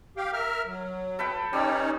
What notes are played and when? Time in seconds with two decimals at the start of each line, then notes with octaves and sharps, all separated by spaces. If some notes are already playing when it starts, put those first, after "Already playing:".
0.17 G4 F5 G5
0.33 A#4 E5 F6
0.66 F#3
1.19 A4 B4 G5
1.53 G3 C#4 D#4 C#5 D5 E6